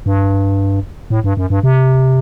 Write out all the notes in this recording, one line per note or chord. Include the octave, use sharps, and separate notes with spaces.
G2
A2
G2
F#2
G2
C3